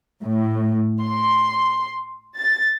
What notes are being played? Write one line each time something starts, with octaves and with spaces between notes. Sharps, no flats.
A2
C6
A6